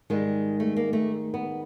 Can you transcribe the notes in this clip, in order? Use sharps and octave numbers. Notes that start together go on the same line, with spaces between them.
G#2 D#3 G3 G#3
A3
A#3
A3
B3